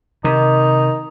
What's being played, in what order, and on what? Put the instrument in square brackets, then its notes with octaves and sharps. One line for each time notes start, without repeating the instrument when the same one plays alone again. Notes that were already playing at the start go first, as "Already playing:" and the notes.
[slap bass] C3 [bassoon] D#3 [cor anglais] D#4